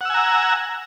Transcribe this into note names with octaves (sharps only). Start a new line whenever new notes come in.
F#5 G#5 A#5 E6